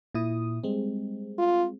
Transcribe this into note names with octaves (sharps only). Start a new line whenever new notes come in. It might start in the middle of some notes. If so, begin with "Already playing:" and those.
A#2 E4 D#6
G3 G#3 C4
F4